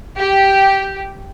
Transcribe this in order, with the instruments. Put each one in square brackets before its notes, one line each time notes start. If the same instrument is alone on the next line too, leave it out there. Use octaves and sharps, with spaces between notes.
[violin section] G4